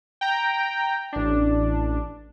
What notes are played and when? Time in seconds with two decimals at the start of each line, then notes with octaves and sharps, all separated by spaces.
0.21 G5 A#5
1.13 A1 D4